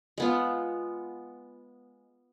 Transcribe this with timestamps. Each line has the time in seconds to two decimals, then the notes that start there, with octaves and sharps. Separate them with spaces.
0.18 G#3 B3 F4